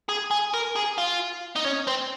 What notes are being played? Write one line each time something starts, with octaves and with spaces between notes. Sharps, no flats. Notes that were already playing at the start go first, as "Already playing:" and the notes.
G#4
G#4
A#4
G#4
F4
D#4
C#4
C4